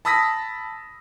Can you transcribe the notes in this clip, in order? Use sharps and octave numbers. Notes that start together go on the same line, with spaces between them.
A5 B5 D#6 E6 A#6 B6